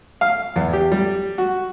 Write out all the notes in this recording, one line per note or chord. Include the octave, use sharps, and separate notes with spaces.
F5
E2
G4
G3
F#4